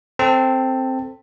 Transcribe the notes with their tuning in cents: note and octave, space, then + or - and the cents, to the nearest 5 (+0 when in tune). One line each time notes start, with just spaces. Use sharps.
C4 +0 A4 +0 A5 +20